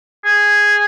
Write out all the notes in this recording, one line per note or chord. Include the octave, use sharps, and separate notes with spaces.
G#4